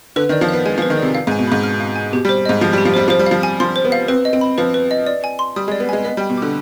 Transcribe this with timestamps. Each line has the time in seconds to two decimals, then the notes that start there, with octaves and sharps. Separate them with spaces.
0.16 D3 B4
0.29 D#3
0.32 D5
0.41 F3
0.49 B3 F5
0.65 G#3 G#5
0.78 F3
0.82 B4
0.90 D#3
0.98 C3 D5
1.15 F5
1.27 G#2
1.31 G#5
1.39 B2
1.47 G#2 B5
1.63 F6
1.80 F5
1.96 G#5
2.13 B2 G4
2.25 G3
2.29 C5
2.45 G#2 D#5
2.61 F3 G4
2.73 G3 G4
2.85 F3
2.94 G3 C5
3.08 F3 C5
3.19 G3
3.26 F3 F5
3.43 G#5
3.60 F3 C6
3.76 C5
3.85 B3
3.92 F5
4.08 C4 B4
4.25 D#5
4.33 C4
4.41 B5
4.58 F3 B4
4.74 B4
4.91 D#5
5.06 D5
5.24 G#5
5.39 C6
5.56 G3 D#6
5.68 G#3
5.72 D5
5.80 B3
5.89 G#3 G#5
6.04 B3 D#5
6.17 G3
6.21 G5
6.30 B2
6.37 D3 D6